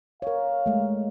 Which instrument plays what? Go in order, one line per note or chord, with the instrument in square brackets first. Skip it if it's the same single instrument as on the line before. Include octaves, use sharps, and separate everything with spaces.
[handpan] A#4 C#5 [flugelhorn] F5
[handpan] G#3 A3